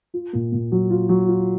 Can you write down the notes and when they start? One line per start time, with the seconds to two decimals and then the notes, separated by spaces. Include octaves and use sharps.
0.14 F4
0.33 A#2
0.52 A#2
0.72 F#3
0.90 F4
1.09 F#3
1.28 F4